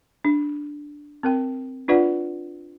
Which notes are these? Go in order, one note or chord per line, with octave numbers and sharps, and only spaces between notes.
D4
C4 A#4 G5
D4 F4 B4 D5 F#5